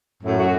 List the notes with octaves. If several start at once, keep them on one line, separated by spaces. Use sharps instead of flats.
F#2 A2
F#4